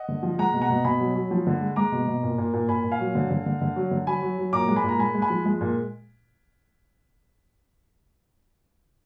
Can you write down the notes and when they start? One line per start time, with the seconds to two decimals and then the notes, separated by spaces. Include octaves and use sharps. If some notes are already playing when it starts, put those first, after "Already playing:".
Already playing: D#5 F#5
0.08 D3
0.23 F3
0.38 G#3 F#5 A#5
0.54 B2
0.62 F#5 A#5
0.70 B2
0.85 B2 G#5 B5
1.00 F#3
1.15 F#3
1.31 F3
1.47 D3
1.61 G#3
1.76 G#3 A#5 D6
1.92 B2
2.08 B2
2.23 A#2
2.38 A#2
2.53 A#2
2.68 A#2 G#5 B5
2.84 A#2
2.92 F5 G#5
3.00 F#3
3.15 D3
3.30 D3
3.46 D3
3.61 D3
3.76 F#3
3.91 D3
4.07 F#3 G#5 B5
4.22 F#3
4.38 F#3
4.53 A#2 A#5 D6
4.68 G#3
4.76 G#5 B5
4.84 A#2 A#5
4.99 G#3 G#5 B5
5.15 G#3
5.22 G#5 B5
5.30 F3
5.45 G#3
5.61 A#2